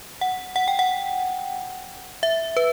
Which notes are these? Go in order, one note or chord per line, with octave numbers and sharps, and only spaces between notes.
F#5
F#5
G5
F#5
E5
B4